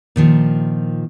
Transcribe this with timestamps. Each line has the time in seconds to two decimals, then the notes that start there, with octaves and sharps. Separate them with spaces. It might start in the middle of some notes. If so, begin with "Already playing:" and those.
0.16 A#2 D#3 F3